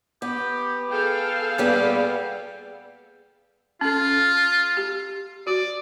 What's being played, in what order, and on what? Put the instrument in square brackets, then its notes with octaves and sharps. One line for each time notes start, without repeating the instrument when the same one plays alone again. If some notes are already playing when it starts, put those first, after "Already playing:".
[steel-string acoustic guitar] B3 [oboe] G4
[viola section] G#4 A4 F5 [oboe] G5
[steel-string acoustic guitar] A#2 G3 B3 [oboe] G5
[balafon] C#4 A4 [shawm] F4
[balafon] G4
[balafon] F#4 [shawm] D5